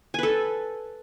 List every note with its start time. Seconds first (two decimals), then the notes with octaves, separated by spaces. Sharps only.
0.14 G#5
0.19 B4
0.23 A4